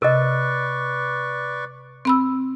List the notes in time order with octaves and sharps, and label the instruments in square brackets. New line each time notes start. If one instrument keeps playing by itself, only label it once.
[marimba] C3 [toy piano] A#4 D#5 [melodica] B4 D5 C#6
[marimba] C4 B5 E6